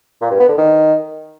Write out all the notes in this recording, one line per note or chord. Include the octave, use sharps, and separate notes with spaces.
A#2
G2
B3
D3
D#3